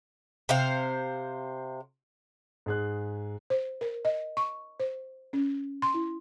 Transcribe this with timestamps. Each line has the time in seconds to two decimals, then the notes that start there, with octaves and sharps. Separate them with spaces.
0.49 C3 C5 F5
2.66 G#2 G#4 F#6
3.50 C5
3.81 A#4
4.05 D#5
4.37 C#6
4.80 C5
5.33 C#4
5.82 C6
5.94 E4